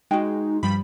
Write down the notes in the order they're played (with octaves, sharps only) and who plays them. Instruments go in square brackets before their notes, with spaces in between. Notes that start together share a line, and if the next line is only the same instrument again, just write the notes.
[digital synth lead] G#3 [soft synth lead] D#4 [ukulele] F#4 G5
[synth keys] G2 F3 G3 [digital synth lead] B5